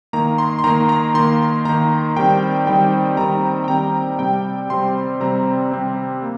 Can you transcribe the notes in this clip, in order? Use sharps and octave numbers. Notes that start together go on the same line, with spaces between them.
D#3 A#3 A#5
C6
C6
D#3 A#3 A#5
A#5
D#3 A#3 C6
D#3 A#3 A#5
D#3 G3 C4 G5
D#3 G3 C4 G5
D#3 G3 C4 A#5
G5
D#3 G3 C4 A#5
C3 G3 C4 G5
C3 G3 C4 C6
C3 G3 C4 A#5
C3 G3 C4
A#3